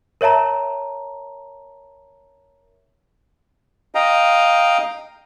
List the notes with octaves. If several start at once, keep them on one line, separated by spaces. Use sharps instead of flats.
A#4 C#5 E5 A5 A#5
D#5 F5 G5 A#5